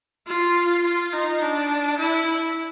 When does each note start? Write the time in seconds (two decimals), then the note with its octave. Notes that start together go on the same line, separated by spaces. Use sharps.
0.27 F4
0.84 F4
1.13 D#4
1.42 D4
1.98 E4